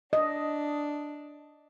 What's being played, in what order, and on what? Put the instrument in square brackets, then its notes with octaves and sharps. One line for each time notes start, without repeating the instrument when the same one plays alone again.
[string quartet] D4 [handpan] D#5